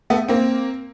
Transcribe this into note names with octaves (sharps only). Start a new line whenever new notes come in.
A3 B3
A#3 C4